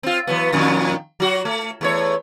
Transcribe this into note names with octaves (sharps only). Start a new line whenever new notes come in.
C4 F4
E3 F#3 B3
F2 A#2 D#3
F#3 F#4
A3
E2 A3 C#5